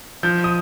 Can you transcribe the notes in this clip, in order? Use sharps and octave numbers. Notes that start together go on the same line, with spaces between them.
F3 G6
D#6